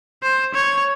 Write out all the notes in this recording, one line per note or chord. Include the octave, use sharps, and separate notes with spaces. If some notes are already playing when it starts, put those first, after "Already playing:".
C5
C#5